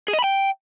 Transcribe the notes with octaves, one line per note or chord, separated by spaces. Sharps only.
G#4
D#5
B5
G5